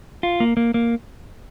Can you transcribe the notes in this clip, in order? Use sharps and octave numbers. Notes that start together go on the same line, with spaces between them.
F4
A#3
A#3
A#3